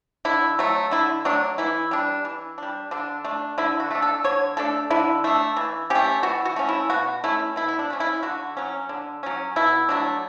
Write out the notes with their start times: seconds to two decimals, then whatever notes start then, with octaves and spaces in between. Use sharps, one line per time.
0.25 D3 E4
0.59 F#3 A3
0.91 D3 E4
1.25 F#3 A3 D4
1.58 E3 E4
1.91 G3 D4
2.25 E3
2.58 G3 D4
2.91 D3 D4
3.25 A3 D4
3.58 D3 E4
3.80 F#4
3.91 A3 D4
4.02 A4
4.24 D3 C#5
4.57 A3 D4 A4
4.90 D3 E4
5.24 A3 D4
5.57 E3
5.90 A3 C#4 G4
6.23 E3 F#4
6.45 F#4
6.56 A3 C#4
6.69 E4
6.90 B2 F#4
7.24 A3 C#4 E4
7.56 B2 E4
7.68 E4
7.79 D4
7.90 A3 C#4
8.00 E4
8.23 D3 F#4
8.57 F#3 C#4
8.89 D3
9.23 F#3 C#4
9.56 B2 E4
9.89 F#3 A3 D4